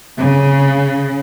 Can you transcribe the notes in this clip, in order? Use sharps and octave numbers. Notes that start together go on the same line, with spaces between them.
C#3